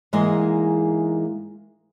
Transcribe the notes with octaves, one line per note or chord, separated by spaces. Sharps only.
G#2 E3 G#3 A#3 G#4 D#5